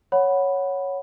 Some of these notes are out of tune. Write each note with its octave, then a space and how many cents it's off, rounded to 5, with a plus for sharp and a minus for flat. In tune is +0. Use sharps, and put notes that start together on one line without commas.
C#5 +0 F#5 +0 B5 +0